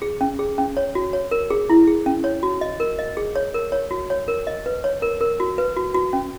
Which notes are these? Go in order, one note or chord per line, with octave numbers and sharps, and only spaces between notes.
G#4
C#4
G#4
C#4
C#5
F#4
C#5
A#4
G#4
E4
G#4
C#4
C#5
F#4
D#5
A#4
D#5
G#4
C#5
A#4
C#5
F#4
C#5
A#4
D#5
B4
C#5
A#4
A#4
F#4
B4
F#4
F#4
C#4